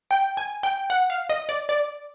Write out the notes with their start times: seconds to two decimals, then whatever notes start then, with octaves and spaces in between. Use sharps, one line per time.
0.11 G5
0.37 G#5
0.63 G5
0.90 F#5
1.10 F5
1.30 D#5
1.49 D5
1.69 D5